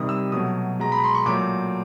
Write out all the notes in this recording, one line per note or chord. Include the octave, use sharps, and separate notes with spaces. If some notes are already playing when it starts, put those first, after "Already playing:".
Already playing: C3 D#3 G3 D#6
E6
B2 F#3 A3 D#6
B2 G#3 A#5
B5
C6
C#6
A#2 F#3 A3 D6